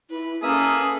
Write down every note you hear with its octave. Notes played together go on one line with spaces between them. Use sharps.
E4 B4
A#3 C#4 G#4 A4 B4 E5 D#6